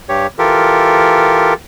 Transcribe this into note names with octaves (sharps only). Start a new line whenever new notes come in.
G2 G4 C#5
E3 F4 G4 A4 A#4